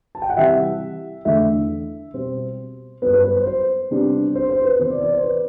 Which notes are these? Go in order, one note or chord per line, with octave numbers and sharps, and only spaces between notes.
A5
G5
F#5
C3 E3 G3 E5
E2 D3 A3 D4 E5
B2 G3 C4 C5
G2 F#3 B3 B4
B4
B4
C5
C5
C3 G3 B3 D4
C5
C5
B4
C3 E3 B3 C5
D5
D5
C5
B4